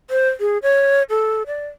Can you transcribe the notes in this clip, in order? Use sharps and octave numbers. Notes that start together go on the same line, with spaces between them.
C5
G#4
C#5
A4
D5